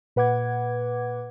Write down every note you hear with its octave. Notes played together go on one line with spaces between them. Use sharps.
A#2 B4 F#5 D6 G#6